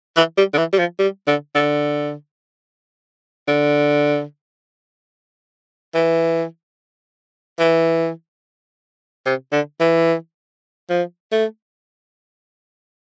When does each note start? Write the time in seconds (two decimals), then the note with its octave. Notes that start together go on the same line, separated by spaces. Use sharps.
0.16 E3
0.37 G3
0.53 D3
0.58 E3
0.73 G3
0.79 F3
0.99 G3
1.27 D3
1.55 D3
3.48 D3
5.94 E3
7.59 E3
9.26 C3
9.52 D3
9.80 E3
10.90 F3
11.32 A3